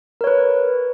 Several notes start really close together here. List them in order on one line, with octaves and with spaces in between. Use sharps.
A#4 C#5 B4